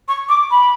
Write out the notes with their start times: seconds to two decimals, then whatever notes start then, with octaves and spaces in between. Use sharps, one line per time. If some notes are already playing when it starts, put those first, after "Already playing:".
0.08 C#6
0.29 D6
0.51 B5